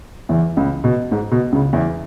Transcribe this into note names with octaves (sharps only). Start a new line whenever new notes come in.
E2 E3
C#2 C#3
B2
G#2
B2
C#2 C#3
E2 E3